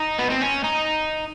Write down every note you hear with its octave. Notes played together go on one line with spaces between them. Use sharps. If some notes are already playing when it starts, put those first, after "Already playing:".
Already playing: D#4
B3
C4
C#4
D#4